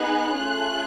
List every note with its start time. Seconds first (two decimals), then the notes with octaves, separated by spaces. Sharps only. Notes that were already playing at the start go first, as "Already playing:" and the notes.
Already playing: B3 D#4 G#4 F#6
0.33 A3 C#4 F4 G#4